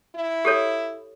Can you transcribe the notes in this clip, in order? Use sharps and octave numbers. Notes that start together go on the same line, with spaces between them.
E4
G4 A4 C#5